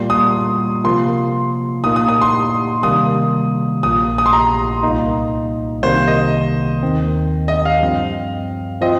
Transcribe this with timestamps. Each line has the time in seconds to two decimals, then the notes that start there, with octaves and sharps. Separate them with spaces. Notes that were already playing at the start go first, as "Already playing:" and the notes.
Already playing: A#2 G3 A#3 F4 C6
0.10 D#6
0.84 C3 F3 A#3 F4 C6
1.84 A#2 A#3 D#4 D#6
1.96 D#6
2.08 D#6
2.21 C6
2.83 C3 D#3 G3 A#3 D#6
3.83 A#1 A#2 A#3 D#6
4.18 D#6
4.26 C6
4.33 A#5
4.83 C2 A#2 A#3 D#4
5.82 C2 C3 D#3 A#3 C5
6.08 D#5
6.83 D#2 D#3 C4
7.48 D#5
7.65 F5
7.82 G2 F3 C4
8.81 F3 C4 F4 D#5